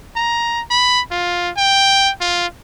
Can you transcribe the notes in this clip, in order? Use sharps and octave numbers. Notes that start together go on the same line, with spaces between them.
A#5
B5
F4
G5
F4